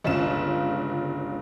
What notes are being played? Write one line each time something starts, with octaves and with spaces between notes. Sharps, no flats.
G1 C#2 F4 E7